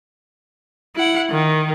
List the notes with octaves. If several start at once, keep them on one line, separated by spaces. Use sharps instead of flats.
E4 F#5
D#3